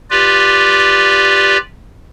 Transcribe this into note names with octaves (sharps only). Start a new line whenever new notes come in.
F4 G4 B4 D5